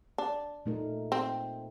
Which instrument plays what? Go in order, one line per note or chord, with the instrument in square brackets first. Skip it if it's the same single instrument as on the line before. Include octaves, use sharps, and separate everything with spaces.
[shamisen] D4
[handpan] A#2 A3 D#4 A#4
[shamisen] C4